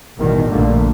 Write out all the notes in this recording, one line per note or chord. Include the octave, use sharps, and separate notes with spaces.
A1 E2 B2 D#3 G3
A#1 G2 A#2 D3 A3 A#3